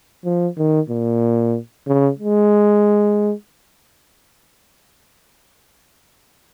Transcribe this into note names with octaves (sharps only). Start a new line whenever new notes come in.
F3
D#3
A#2
C#3
G#3